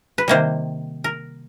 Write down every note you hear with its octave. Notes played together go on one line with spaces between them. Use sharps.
B4
C3 D#3 G3 A#3 C5
A#4